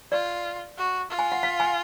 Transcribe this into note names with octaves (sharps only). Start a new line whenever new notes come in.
F4 D5
F#4
F4
G#5
F#5
F5
G#5